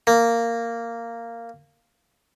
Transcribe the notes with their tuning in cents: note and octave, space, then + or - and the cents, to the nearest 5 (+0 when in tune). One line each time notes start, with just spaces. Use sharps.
A#3 -10